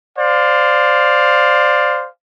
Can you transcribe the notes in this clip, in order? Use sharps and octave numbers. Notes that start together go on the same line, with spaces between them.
C5 D5 F5